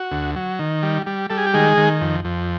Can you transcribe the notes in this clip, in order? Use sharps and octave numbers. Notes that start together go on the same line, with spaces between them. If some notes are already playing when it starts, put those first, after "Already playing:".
Already playing: F#4
D2
F#3
D#3
G3
G3
G3 A4
G#4
G4
D#3 G#3 G#4
D#3
F2
F2